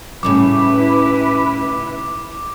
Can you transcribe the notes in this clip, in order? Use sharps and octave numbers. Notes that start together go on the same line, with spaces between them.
A2 C#3 G3 E4 B4 D6